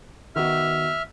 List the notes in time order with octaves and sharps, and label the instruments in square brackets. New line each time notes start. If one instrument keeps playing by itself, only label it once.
[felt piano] D#3 B3 F#4 [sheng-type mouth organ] E5 F6